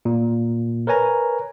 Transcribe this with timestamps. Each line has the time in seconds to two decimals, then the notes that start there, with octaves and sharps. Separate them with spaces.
0.05 A#2
0.87 A#4 B4 C#5 G#5 A#5